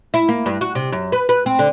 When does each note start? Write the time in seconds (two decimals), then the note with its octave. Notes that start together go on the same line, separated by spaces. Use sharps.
0.14 E4
0.28 A#3
0.46 G2
0.61 F#4
0.75 C3
0.92 F#2
1.12 B4
1.29 B4
1.46 C4
1.59 D3